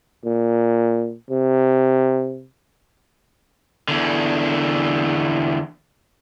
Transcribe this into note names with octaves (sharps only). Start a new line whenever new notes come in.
A#2
C3
E2 D3